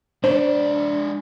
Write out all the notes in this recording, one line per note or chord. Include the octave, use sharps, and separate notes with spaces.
G#3 D4 C5 D5